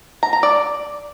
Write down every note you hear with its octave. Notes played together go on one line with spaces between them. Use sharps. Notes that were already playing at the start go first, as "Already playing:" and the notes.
A#5
A#5
D5